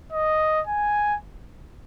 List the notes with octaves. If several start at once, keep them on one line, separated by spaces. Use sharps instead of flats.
D#5
G#5